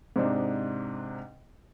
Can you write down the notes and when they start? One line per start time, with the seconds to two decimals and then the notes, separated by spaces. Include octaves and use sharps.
0.16 G#2 C3 D4 D#4